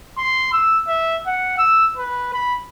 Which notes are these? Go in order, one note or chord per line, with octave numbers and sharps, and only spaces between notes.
C6
E6
E5
F#5
E6
B4
B5